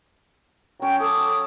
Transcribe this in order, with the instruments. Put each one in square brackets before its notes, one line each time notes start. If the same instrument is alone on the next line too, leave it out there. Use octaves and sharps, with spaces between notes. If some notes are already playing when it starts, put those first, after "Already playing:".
[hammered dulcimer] F#3 C#4 [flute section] G5
[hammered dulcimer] A4 [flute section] A5 D6 D#6